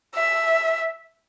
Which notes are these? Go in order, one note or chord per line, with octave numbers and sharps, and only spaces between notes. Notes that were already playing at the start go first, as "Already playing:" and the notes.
E5